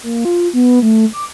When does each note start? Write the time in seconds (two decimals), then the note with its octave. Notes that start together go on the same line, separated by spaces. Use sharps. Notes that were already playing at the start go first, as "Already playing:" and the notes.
0.03 A#3
0.25 F4
0.54 B3
0.82 A3
1.13 D6